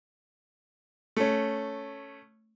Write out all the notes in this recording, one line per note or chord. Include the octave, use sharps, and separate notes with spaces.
A3 C#4